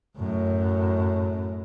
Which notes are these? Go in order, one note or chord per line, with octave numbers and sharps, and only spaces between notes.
F#2 A2